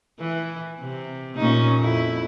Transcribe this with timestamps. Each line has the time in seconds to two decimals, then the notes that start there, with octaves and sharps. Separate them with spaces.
0.19 E3
0.80 C3
1.36 A#2 C#4 D#4
1.78 F2 E4